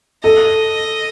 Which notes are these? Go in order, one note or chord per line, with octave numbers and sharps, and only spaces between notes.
A4 D#5